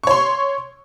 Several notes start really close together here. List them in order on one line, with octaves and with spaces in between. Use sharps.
C#6 C#5 C6